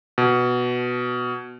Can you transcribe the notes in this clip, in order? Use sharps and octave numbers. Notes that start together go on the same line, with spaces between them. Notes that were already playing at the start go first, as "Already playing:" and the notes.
B2